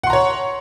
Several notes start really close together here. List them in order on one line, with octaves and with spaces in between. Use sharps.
F#5 C6 A#5 C#5